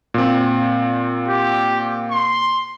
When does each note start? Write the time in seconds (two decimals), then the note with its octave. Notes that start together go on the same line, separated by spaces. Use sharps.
0.14 A#2 C4
1.28 G4
2.11 C6